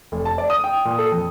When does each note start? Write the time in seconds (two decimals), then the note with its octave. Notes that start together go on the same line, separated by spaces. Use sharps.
0.12 F1
0.25 A5
0.38 D5
0.50 D#6
0.64 G5
0.85 A#2
0.99 A4
1.12 F2